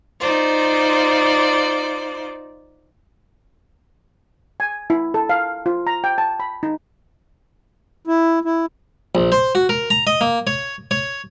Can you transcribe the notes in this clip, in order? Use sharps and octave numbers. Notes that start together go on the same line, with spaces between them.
D#4 F4 C5 D5
G#5
E4
A4
F5
F4
A#5
G5
A5
B5
D#4
E4
E4
A#1
C5
F#4
A#4
A#5
D#5
A#3
C#5
C#5